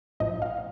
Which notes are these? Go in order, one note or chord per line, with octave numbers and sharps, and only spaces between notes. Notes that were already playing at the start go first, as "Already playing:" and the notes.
A#1 A2 F3 D#5
F5